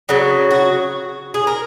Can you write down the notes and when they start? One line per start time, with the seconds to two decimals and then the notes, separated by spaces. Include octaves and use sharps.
0.09 C#3 F#3
0.51 F#4
1.34 G#4
1.47 A#4